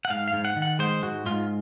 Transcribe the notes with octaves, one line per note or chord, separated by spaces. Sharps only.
F#5
G#2 F5
F5
G#2
F#5
D#3
F#5
G#3 C5
G#2 F#4
G#2 F4